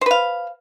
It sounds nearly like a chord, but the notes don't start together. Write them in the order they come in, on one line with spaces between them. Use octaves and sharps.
C5 B4 F5